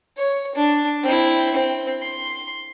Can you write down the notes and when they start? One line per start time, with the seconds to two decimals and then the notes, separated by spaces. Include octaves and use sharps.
0.18 C#5
0.56 D4
1.03 C4 E4
1.54 C4
2.01 C6